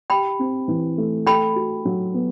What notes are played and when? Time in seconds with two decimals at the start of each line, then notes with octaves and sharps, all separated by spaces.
0.10 G4 G5 B5
0.39 C4
0.68 E3
0.98 A3
1.27 A4 G5 B5
1.56 F#4
1.85 F#3
2.14 B3